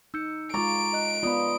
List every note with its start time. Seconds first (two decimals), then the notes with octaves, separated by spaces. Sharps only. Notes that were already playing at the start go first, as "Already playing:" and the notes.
0.14 D#4 E6 G6 C#7
0.54 G#3 F4 A#5 C#6 D6 A6 D7
0.93 D#5 F#6
1.23 B3 F4 D5 D#5 B5